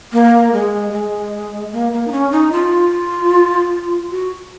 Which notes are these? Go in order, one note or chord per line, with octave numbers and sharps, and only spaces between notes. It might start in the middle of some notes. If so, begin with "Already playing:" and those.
A#3
G#3
G#3
A#3
A#3
D#4
C#4
D#4
F4
F#4